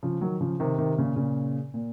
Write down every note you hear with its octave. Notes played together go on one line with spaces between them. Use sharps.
C#3 F3
D#3 F#3
C#3 F3
C3 D#3
C3 D#3
A#2 C#3
A#2 C#3
A#2